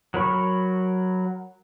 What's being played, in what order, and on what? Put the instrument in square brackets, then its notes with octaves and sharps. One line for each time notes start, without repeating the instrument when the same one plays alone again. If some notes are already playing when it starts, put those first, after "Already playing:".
[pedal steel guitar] F#3 A#4 B5 C#6